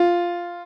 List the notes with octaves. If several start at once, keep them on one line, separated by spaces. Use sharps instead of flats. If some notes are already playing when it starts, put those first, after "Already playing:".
Already playing: F4